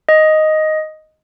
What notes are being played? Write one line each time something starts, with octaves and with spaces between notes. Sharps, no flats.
D#5